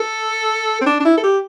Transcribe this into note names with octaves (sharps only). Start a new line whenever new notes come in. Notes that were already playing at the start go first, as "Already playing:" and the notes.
Already playing: A4
C4
D4
D4
E4
A4
G4